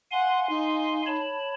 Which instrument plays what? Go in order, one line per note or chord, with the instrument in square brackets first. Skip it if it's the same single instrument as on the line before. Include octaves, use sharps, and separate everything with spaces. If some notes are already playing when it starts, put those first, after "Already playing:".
[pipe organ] F5 G#5 C6 [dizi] F#5
[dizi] D#4
[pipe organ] C#5 A5 B5